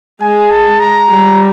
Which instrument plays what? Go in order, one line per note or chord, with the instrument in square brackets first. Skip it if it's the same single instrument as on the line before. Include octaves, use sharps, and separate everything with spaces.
[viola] G#3 [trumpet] G#5
[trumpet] A5
A#5
[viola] G3